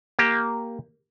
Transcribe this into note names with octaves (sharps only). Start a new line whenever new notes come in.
A#3 G4